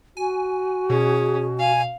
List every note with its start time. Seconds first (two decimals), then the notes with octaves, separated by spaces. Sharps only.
0.17 F#4 G#5
0.90 B2 C#4 G#4
1.59 F5 G#5